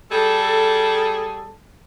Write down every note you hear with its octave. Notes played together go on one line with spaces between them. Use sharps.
G3 G#4 A4